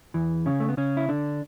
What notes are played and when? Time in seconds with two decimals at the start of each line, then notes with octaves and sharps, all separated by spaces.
0.14 E2 E3
0.46 C#3 C#4
0.60 A3
0.69 B3
0.77 C#3 C#4
0.97 E4
1.09 D3 D4